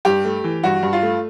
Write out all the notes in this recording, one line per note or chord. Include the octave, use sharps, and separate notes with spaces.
G2 G4
A3
E3
G2 F#4
G2
F4
A3